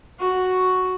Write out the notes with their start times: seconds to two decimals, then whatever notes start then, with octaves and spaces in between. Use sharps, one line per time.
0.20 F#4